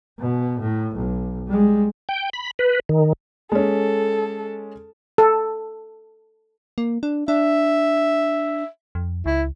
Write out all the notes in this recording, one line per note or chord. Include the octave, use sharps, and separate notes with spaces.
B2
A2
B1
G3 G#3
G5
B5
B4
D#3
G#3 C#4 A4
A4
A#3
D4
D4 E5
F2
C#2 E4